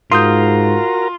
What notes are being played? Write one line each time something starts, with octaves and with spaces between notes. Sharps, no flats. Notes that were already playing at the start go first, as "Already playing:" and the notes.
G#2 F4 F#4 A#4 A#5 C6 D#6 G6